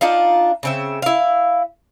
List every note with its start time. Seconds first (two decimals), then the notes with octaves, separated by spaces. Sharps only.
0.01 D4 D#4 F4 F5
0.63 C#3 C4 E5
1.02 E4 F5